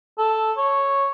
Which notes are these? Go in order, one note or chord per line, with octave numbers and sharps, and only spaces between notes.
A4
C#5